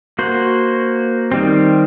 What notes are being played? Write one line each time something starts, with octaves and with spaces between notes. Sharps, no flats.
A#3 F#4 C5
D#3 G3 C4